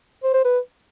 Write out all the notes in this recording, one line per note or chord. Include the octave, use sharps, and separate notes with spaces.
C5
C5
B4